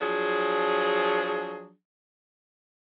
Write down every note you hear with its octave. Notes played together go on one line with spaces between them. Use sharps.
F3 F#3 D4 G#4